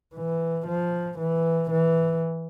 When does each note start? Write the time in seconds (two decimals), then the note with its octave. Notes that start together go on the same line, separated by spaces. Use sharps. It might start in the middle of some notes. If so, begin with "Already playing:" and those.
0.15 E3
0.67 F3
1.19 E3
1.71 E3